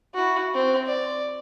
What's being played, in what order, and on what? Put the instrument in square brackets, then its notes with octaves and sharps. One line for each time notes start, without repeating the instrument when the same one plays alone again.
[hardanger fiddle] E4 F#4
C4
D5